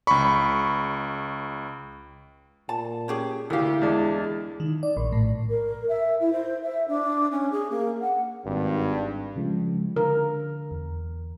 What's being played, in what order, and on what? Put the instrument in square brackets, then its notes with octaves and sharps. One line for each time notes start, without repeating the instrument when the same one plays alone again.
[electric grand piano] C#2 C#6 [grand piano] B5
[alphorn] A#2 [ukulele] A5
[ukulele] C#4 G4 G#4
[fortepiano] D2 G4 [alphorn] E4 [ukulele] A#4 F5
[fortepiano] E2 D4 [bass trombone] G#3
[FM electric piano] D#3
D5
A#1
A2
[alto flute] A#4
E5
E4
C5
E5
D4
C#4
G#4
A#3
F#5
[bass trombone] G#1 [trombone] G2
[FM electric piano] C#3 F3 G#3
[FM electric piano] D3 [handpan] A#4
[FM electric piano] E2